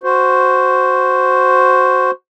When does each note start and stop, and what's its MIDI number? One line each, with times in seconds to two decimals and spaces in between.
0.03 2.11 66
0.03 2.11 72